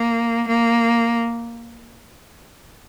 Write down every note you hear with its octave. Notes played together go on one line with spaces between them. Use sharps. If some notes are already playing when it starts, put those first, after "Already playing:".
Already playing: A#3
A#3